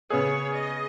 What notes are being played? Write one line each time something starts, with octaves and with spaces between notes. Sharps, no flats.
C#3 B3 G#4 C#5
D#5